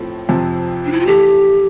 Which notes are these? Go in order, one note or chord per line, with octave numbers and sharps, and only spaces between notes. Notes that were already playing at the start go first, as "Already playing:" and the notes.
Already playing: A2 F3 A3 C4
F2 C3 F3 C4
D4
E4
F4
E3 A3 E4 G4 A4